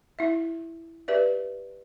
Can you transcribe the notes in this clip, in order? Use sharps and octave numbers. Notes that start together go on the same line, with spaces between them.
E4 E5
G4 B4 D5 E5